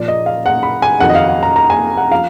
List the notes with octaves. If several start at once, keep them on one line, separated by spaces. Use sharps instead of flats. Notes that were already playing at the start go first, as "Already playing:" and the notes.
Already playing: A#2 F3 D5
D#5
F5
F#5
B5
G#5
F2 D#3 F#3 F#5
D#5
F5
F#5
A#5
A#5
G#5
F#5
F3 F5